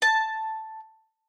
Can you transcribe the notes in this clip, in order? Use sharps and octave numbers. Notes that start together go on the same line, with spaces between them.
A5